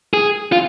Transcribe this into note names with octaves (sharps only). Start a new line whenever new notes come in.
G#4
F4